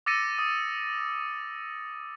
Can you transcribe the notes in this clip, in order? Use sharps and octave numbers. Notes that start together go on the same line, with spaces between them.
D6 E6 A6 A#6 C#7 D#7
D#6